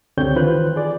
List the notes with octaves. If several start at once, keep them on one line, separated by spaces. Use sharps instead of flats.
C#2 D3 C4 G4 C#5 G6
D#3 E3 F4 B4 C5 F#6
G#4 D5